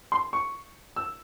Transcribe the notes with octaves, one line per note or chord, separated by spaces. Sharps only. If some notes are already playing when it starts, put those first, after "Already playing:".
C6
C#6
E6